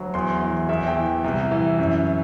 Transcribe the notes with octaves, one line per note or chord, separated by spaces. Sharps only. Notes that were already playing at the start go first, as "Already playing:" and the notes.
Already playing: D2 F#3
E2 C6
E3
E2 E5
G5
E3
C2
E3
F#2